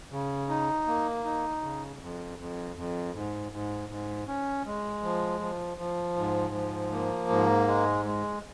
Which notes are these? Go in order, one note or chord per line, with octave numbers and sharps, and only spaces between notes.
C#3
D#4
A#3
D#4
C#3
F2
F2
F2
G#2
G#2
G#2
C#4
G#3
F3
F3
F3
G#2
F3
A#3
G#2
G#3
G#3